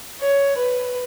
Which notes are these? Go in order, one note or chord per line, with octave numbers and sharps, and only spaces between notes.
C#5
B4